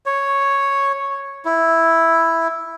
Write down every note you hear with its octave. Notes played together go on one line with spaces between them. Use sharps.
C#5
E4